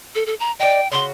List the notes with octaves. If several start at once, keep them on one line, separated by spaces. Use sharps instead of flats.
A4
A4
A#5
D#4 D5 G5
C#3 F#4 C6